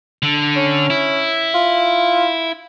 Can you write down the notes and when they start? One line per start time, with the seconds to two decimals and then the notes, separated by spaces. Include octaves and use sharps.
0.23 D3
0.56 C#4
0.90 E4
1.54 F4